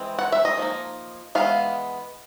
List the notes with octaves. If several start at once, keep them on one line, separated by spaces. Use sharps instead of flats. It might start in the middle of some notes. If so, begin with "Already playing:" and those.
Already playing: E3 G#3 C4
F#5
E5
D#5
F3 A#3 D#4
E3 G#3 B3 F5